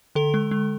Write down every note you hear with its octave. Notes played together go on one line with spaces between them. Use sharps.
D3 A4
G#3
G#3